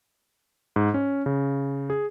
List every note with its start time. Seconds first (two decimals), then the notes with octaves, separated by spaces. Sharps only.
0.76 G#2
0.94 C#4
1.26 C#3
1.90 G#4